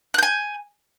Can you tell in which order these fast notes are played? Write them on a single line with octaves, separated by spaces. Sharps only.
F#6 G6 G#5